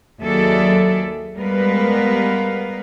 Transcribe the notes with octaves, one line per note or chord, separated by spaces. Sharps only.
D#2 F#3 G#4 A4 D5 E5
G3 G#3 B3 A#4 B4 F5